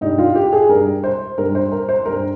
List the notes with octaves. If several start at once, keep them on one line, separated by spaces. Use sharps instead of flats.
G2 G3 D#4
F4
G4
G#4
G2 G3 A#4
C5
G2 G3 A#4
C5
A#4
C5
G2 G3 A#4